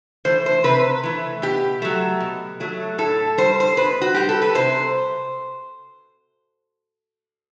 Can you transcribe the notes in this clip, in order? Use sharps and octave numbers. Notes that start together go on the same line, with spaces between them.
E3 A3 C5
C5
C3 B4
E3 A3
B2 G4
F#3 A3
B2
F#3 A3
A2 A4
G3 C5
C5
B2 B4
F#4
G3 G4
A4
B4
C3 C5